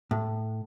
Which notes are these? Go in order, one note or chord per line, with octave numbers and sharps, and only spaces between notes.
A2